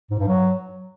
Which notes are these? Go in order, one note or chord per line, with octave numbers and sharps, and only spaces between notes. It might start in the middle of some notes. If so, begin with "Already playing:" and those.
G#2
G2
F#3